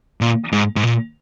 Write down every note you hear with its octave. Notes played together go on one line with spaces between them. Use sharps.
A#2
G#2
G#2
A#2